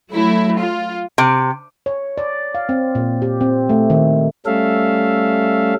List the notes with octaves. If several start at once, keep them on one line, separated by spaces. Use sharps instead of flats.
F#3 A3 E4
F4
C3
C#5
D5
F5
C4
A#2
G4
C4
A3
D#3
G3 A3 C#4 A4 E5 F5